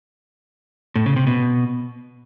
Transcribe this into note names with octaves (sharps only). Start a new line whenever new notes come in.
A2
C#3
C3
B2